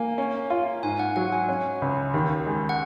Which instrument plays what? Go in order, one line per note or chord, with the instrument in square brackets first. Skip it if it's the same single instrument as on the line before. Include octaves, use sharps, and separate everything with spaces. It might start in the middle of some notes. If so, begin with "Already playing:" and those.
Already playing: [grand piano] A#3 [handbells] G#5
[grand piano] C#4
F4
[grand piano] G#2 [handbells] G#5
[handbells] F#5
[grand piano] F#3 [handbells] F#5
[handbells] G#5
[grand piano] C#4
C#2
D#2
G#3
[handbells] F#5